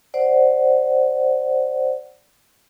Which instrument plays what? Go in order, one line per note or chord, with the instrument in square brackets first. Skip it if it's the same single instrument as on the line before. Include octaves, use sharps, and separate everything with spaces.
[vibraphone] C5 D5 F#5